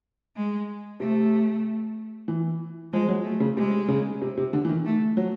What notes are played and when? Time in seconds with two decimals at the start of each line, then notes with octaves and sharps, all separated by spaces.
0.36 G#3
1.00 C3 A3
2.28 E3
2.93 F3 G#3
3.09 F#3
3.24 A3
3.40 C#3
3.57 C3 G#3
3.88 C#3
4.22 C3
4.37 C3
4.53 D3
4.65 E3
4.69 D#3
4.85 A3
5.17 F#3